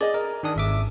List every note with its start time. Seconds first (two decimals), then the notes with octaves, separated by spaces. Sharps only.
0.01 G#4 D5 D#5
0.14 A#4
0.43 D#3 D4 D#6
0.56 G#1 E5 D6